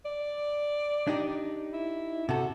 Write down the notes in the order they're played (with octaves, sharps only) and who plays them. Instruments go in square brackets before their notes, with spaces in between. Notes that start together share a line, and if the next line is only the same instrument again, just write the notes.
[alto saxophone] D5
[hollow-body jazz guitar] D4 D#4 G4
[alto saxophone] E4
[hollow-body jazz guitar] C3 A4 [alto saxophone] F#4